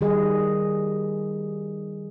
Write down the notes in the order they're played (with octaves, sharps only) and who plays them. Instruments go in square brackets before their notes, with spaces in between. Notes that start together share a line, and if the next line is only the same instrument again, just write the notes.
[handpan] D#3 G3 G#4 D#5